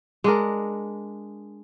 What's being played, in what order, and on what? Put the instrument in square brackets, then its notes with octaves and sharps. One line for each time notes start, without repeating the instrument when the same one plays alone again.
[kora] G#3 D4 A#4